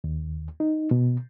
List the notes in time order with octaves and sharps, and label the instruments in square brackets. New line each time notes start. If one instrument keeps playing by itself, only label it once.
[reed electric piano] D#2
D#4
B2